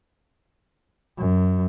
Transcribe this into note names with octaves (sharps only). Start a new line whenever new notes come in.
F#2